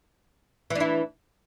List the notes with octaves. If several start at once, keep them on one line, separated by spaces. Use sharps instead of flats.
E3 D4 E4